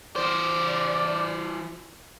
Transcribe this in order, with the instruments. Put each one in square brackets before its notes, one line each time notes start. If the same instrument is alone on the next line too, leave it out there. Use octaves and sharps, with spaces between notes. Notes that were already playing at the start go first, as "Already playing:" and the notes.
[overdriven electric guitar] E3 C5 [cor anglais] D5